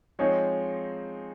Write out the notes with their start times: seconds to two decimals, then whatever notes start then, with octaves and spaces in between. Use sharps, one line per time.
0.19 F3 G#3 C4 D#4 C#5